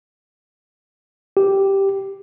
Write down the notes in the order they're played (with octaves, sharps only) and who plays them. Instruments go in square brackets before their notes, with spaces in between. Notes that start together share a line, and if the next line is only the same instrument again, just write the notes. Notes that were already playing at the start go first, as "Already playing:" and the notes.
[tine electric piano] G4